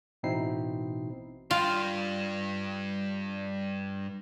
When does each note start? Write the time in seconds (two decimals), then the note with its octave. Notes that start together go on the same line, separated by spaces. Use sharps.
0.23 A1 B2 C4 D#4 E4 C7
1.51 G2 F4 G5